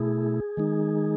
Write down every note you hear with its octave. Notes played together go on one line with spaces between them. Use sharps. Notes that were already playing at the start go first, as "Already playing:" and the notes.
Already playing: B2 A3 E4 G#4
D#3 G#3 D#4